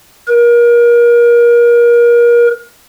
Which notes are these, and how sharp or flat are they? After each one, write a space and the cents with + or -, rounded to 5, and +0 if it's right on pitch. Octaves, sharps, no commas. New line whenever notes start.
A#4 +30